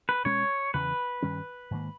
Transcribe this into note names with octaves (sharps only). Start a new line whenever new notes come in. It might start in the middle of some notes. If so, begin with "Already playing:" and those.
B4
B2 G#3 C#4 C#5
E2 C#3 E3 B4
G2 D#3 G3 C#4
G#2 D#3 A#3